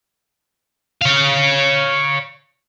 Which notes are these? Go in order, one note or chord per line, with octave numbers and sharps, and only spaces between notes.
C#5 F5